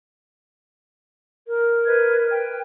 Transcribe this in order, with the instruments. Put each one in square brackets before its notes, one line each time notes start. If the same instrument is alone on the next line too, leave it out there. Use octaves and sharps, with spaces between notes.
[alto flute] A#4
[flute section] B4 D#5 G#6
B4 G5